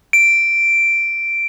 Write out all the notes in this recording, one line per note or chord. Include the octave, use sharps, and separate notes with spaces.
D7